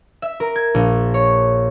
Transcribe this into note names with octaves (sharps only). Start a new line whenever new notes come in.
E5
A#4
G#6
A#1
C#5